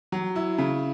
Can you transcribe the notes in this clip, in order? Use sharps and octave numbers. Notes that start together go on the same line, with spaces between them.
F#3
E4
C#3